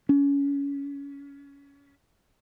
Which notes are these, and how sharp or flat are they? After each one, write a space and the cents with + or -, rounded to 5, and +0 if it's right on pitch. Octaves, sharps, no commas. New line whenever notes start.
C#4 +25